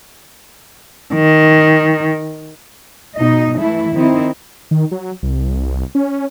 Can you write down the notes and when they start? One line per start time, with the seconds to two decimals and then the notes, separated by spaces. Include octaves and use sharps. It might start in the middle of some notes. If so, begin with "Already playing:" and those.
1.14 D#3
3.18 B2 D#4 D#5
3.60 E3 A3 E4
3.95 D#3 C4 D#4 E4
4.71 D#3
4.91 F#3
5.23 C2
5.95 C#4